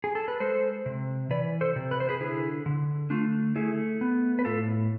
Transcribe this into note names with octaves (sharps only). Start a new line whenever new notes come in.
G#4
A4
B4
G#3 A4 C5
C3
E3 B4 D5
A4 C5
C3
B4
C5
G#4 B4
D3 E4 G#4
D3
A3 D4 F4
A3 E4 G#4
B3
B4
A2 F4 A4